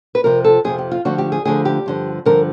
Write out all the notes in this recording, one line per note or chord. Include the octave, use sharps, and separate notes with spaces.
B4
F2 C3 F3 A#4
A4
F2 C3 F3 G#4
G4
F4
D2 D3 F3 F#4
G4
G#4
D2 D3 F3 G#4
G4
G2 D3 F3
G2 D3 F3 A#4